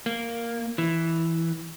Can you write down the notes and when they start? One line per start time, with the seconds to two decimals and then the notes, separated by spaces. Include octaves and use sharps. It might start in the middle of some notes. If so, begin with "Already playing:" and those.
0.06 A#3
0.78 E3